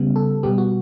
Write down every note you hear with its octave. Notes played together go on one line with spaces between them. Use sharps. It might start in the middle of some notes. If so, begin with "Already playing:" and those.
Already playing: C#3 G3 B3
A4
B2 G3 B3 G4
F#4